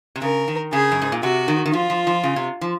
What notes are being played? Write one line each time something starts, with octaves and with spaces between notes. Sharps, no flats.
C3
C#3 A#4
D#3
C#3 G#4
F#2
G#2
A#2
C3 F#4
D#3
D#3
F3 F4
F3
F3
C#3
C3
F3